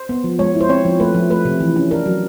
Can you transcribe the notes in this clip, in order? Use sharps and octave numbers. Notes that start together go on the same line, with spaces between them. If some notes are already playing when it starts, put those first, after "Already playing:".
Already playing: C5
B3
F3
G#3 C#5
E4
C5
C4 C#5
F3
A3 B4
F3
A3 B4
C3
E3
C#4
D4 A#4
F#3